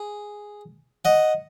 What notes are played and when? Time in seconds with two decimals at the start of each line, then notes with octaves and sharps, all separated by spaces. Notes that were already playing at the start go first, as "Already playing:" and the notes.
Already playing: G#4
1.05 D#5 F#5